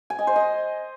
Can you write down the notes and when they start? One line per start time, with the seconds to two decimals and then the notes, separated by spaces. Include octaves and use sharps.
0.10 G#5
0.19 D#5
0.27 C5
0.36 D#5